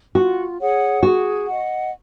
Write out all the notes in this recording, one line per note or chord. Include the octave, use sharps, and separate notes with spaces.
F4 F#4
G#4 C#5 F#5
F#4 G#4
D#5 F#5